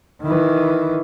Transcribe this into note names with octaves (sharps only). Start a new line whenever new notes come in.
D#3 E3